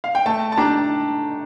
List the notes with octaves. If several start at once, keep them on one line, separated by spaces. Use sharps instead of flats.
F5
G5
A3 A5
A5
D4 G4 A#5